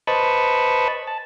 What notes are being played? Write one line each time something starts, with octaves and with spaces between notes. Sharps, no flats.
B4 C5 D#5 A5 B5 C#6
A5